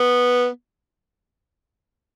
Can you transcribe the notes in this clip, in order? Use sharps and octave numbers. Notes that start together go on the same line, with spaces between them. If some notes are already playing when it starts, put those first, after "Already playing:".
Already playing: B3